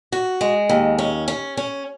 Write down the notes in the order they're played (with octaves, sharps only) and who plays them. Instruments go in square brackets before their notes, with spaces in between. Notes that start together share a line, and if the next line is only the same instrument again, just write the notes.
[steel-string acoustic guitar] F#4
G#3
D#2
C#4
C#4
C#4